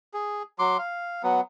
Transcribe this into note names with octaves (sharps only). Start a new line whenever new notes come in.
G#4
F#3 C6 D6
F5
F#3 B3